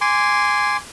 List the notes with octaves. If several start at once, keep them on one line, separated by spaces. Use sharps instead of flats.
G#5 C6 D6